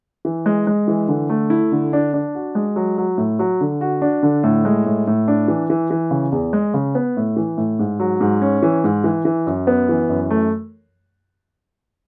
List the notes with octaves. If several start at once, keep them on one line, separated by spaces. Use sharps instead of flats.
E3
G#3
G#3
E3
D3
A3
E4
D3
D4
D4
F#4
G#3
F#3
F#3
A2
F#3
D3
F#4
D4
D3
A2
G#3
A2
A2
D4
E3
E3
E3
C#3
E2
G#3
C#3
B3
A2
E3
A2
G#2
F#3
G#2
C#4
E3
G#2
E3
E3
F#2
B3
E3
F#2
A3